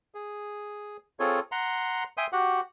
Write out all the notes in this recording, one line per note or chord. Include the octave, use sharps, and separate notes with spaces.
G#4
C4 F4 G#4 A4 C#5
F#5 A#5 C6
E5 G5 G#5 C6 D#6
F#4 G4 F#5